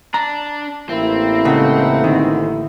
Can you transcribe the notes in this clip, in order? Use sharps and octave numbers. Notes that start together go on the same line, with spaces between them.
D4 A#5
A1 A#3 C4 E4
C#2 G2 C#3 D#4 A4 F#5
G#2 D3 D#3